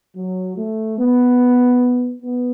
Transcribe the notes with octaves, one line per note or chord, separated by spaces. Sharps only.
F#3
A3
B3
B3